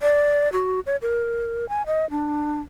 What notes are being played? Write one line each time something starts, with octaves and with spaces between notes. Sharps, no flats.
D5
F#4
C#5
A#4
G#5
D#5
D4